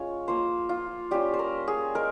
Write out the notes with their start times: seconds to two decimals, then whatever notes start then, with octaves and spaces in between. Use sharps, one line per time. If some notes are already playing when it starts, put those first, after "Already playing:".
Already playing: G#3 C#4 F4 C#5
0.28 F3 A#3 F4 C5
0.69 F4
1.11 G3 C#4 F4 G4
1.34 C5
1.39 A#4
1.68 G#4
1.95 G#3 A#4